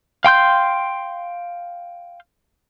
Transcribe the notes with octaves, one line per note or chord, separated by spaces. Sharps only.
F5 G5 C6 G6